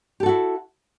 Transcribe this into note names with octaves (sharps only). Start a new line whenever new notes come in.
E4 F#4 G4 A4